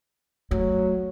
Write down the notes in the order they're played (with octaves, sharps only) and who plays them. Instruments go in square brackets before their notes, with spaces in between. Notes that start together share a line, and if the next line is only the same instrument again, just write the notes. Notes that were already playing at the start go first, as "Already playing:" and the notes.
[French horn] F#3 [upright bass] A3